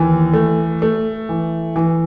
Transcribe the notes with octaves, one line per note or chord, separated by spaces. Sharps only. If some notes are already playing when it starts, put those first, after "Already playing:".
Already playing: D#2 E3
A3
A3
E3
E3